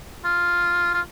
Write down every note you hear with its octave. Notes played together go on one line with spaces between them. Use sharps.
F4
F4